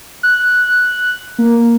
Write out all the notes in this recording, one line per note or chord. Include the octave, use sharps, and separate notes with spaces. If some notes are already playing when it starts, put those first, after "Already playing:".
F#6
A#3